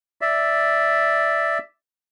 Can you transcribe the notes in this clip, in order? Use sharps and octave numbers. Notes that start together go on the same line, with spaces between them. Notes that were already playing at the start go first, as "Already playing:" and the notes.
D5 E5